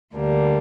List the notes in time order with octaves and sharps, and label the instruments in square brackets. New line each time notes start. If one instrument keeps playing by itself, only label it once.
[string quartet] D2 D3 G3 A#3 D4